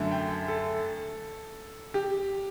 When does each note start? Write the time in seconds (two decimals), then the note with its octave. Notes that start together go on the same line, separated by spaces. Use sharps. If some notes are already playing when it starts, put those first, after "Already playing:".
Already playing: F#2 D3 A3
0.11 G5
0.48 A4
1.94 G4